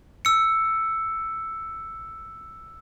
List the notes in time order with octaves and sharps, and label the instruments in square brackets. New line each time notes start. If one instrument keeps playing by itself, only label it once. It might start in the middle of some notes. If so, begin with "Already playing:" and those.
[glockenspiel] E6 C#7